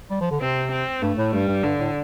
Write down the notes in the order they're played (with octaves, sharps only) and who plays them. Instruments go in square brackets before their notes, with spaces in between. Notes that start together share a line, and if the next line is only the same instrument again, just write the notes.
[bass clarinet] G3
F3
D3
[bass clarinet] C3 [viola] C4
[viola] C4
[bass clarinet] G2 [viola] A3
[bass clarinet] A2
[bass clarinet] G2 [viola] G3
[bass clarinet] G2
[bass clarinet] G2 [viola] D3
[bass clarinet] A2